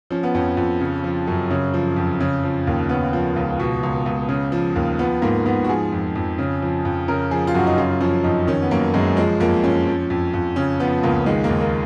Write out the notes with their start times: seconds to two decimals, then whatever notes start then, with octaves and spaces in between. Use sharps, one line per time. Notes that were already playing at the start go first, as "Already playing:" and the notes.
0.10 F3 C#4
0.23 B3
0.34 F2 C#4
0.57 F2
0.80 C#3
1.04 F3
1.28 F#2
1.51 C#3
1.74 F3
1.96 F2
2.20 C#3
2.43 F3
2.67 D#2
2.89 C#3 B3
3.13 F3
3.36 C#2
3.60 B2
3.83 C#2
4.06 C#2
4.29 C#3
4.52 F3
4.76 D#2
4.99 F3 B3
5.22 G#2 A#3
5.45 G#2 B3
5.64 F#4
5.69 F3 G#4
5.92 F2
6.15 F2
6.38 C#3
6.62 F3
6.85 F2
7.08 C#3 A#4
7.31 F3 G#4
7.47 F4
7.54 F#2 F#4
7.67 D#4
7.78 C#3 F4
8.01 F3 C#4
8.24 F2 D#4
8.47 D#3 C#4
8.62 B3
8.71 F#2 A#3
8.94 F#2 G#3
9.17 F3 G#3
9.40 F2 A#3
9.64 F2 C#4
9.87 F3
10.10 F2
10.34 F2
10.56 C#3 C#4
10.80 F3 B3
11.03 C#2 A#3
11.26 D#3 G#3
11.44 A#3
11.50 D#2
11.61 A#3